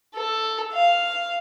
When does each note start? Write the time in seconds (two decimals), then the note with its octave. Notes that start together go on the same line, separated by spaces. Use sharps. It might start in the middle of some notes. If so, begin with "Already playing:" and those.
0.15 A4
0.73 F5